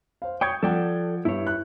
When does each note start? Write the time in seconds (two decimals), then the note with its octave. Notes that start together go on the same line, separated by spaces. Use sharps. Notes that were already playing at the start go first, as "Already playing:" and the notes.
0.22 C5 F5
0.41 C#5 G5 D#6 G6 G#6
0.63 F3 A4 D5 F#5 G5
1.25 G2 E4 C#5
1.47 F#6